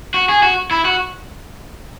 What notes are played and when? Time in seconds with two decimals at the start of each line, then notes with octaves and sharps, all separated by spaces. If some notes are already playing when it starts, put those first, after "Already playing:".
0.14 F#4
0.29 G#4
0.43 F#4
0.71 E4
0.85 F#4